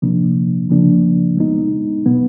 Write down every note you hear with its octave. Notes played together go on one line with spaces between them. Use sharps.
C3 F3 A#3 D4
C#3 F3 A#3 D4
G#3 B3 D#4
B2 F#3 B3